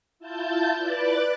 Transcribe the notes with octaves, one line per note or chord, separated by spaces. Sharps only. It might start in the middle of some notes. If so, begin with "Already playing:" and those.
E4 F4 A5 G6
B4 D5 D6 F#6 A6